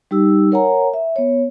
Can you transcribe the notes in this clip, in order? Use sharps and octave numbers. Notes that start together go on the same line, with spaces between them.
G3 D#4 G4 E6
A#4 C#5 F#5 G#5 A#5
E5
B3 C#5